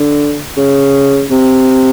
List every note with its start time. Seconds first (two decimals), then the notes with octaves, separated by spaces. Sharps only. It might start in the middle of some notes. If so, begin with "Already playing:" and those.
Already playing: D3
0.57 C#3
1.31 C3